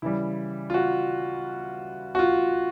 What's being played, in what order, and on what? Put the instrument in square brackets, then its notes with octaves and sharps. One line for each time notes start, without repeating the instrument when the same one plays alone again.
[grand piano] C#3 E3 G3 E4
F4
F#4
F#4
F4